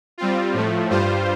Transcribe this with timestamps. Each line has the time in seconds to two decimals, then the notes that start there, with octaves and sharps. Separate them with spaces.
0.18 G3 C4 F4
0.53 A2 F3 A3
0.90 G2 G3 F4 C5